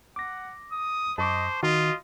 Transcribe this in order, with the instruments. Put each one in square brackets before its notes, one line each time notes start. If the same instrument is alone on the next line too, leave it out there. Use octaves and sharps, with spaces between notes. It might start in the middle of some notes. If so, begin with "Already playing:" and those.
[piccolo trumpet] F#5 [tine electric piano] D6 A#6
[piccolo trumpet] D#6
[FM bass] F#2 [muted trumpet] C5 [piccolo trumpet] D#5 [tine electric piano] A5 C#6 D6
[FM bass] D#3 [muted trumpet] F4 [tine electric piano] F#4 [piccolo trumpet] D#5